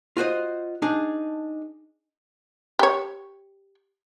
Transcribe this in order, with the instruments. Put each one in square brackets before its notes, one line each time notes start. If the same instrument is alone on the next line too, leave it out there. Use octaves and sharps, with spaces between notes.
[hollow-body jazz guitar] F4 F#4 C5 D#5
D4 D#4 G#4
[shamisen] G4 C#5